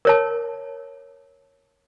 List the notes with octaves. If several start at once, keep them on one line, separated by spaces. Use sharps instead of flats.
A#4 C#5 A5